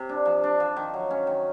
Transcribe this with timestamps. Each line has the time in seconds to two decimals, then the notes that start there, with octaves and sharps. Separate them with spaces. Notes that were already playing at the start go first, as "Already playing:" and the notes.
Already playing: C3
0.09 D4
0.26 F3
0.44 D4
0.60 F3
0.77 D#3
0.94 F#3
1.11 C#4
1.27 D#3